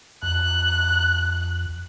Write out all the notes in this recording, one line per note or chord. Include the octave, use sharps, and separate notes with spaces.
F2 F#6